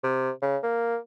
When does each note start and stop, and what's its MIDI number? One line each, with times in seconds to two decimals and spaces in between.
0.04 0.31 48
0.42 0.57 49
0.63 0.97 58